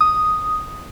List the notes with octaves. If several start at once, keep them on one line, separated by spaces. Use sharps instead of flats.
D#6